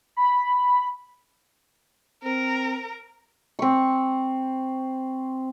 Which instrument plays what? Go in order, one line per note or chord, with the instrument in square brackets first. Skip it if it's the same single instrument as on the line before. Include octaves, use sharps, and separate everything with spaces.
[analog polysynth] B5
[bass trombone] C4 [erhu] A#4
[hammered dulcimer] C4 C#6